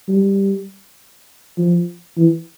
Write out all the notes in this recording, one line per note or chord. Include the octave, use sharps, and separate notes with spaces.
G3
F3
E3